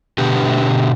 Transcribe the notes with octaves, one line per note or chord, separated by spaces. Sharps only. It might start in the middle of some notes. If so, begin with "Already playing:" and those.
B2 D3 B3 G4